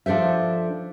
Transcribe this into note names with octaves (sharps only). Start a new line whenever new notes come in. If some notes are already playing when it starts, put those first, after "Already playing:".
F3 D4 A4 C5 E5